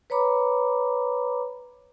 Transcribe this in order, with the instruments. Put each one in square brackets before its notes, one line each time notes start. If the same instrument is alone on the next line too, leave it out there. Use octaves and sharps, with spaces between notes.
[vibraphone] B4 C#5 A#5 B5 D6